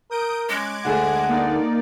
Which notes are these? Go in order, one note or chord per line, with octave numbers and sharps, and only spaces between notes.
A#4 D#6 G6 D7
G#3 C#4 D6 F#6 G#6
D2 G#4 A4 F#5
A#3 D#4 D5